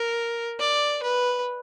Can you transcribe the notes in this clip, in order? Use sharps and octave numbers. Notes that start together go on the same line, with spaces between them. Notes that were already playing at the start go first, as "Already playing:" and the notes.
Already playing: A#4
D5
B4